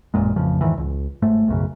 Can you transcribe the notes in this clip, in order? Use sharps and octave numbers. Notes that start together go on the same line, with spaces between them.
A1 F#2 A#2 G#3
A1 F2 C#3 F3
E2 G#2 D#3 E3
C#2
G1 G#2 A3
B1 F#2 C#3